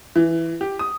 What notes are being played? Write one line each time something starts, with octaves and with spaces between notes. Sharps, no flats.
E3
G4
D#6